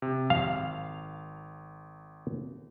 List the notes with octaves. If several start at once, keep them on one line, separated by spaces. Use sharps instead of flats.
C3
G#1 F5